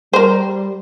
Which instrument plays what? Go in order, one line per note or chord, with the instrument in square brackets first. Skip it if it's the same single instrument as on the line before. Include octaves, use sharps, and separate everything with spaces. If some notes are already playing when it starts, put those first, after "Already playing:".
[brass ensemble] G3 [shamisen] A#4 C5